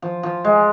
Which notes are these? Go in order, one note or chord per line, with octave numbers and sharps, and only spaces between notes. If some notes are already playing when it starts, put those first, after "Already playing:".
F3
F3
G#3